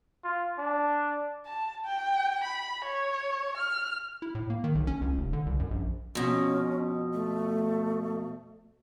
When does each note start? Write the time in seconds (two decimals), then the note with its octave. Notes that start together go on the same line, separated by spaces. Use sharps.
0.24 F4
0.58 D4
1.46 A5
1.86 G5
2.44 B5
2.85 C#5
3.57 F6
4.22 E4
4.35 A2
4.50 A#3
4.64 D#3
4.75 B1
4.87 C#4
5.01 C#2
5.18 F1
5.33 D3
5.46 C2
5.60 F#2
5.71 A#1
6.15 F2 B2 C#4
7.13 A3